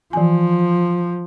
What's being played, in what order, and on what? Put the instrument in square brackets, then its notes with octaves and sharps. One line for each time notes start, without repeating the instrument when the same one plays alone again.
[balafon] E3 G#5 [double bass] F3